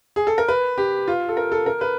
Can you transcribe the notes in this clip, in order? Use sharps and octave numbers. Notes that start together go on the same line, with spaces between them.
G#4
A4
A#4
B4
G4
F4
A4
A#4
A4
A#4
B4